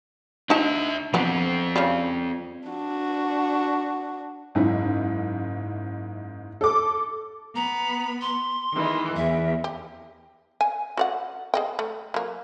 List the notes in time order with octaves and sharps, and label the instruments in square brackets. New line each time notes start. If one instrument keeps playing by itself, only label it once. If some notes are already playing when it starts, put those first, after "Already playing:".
[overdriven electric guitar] D4 E5 [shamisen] D#4 A5
[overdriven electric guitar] F3 C4 [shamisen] B3 D4
[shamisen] C#3 G3
[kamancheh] D4 F#4
[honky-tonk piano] F#1 G#2 E4
A4 D6
[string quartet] B3 B5 [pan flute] A#5
[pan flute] C6
[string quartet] D#3 E3 G#3
[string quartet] E2 [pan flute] E5
[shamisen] G4
G#5
F#4 D5 F#5
G#4 D#5 G5
A3
F#3 A#3